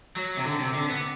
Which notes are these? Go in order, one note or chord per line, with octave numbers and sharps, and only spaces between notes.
F#3
C3
D3
C3
D3
B3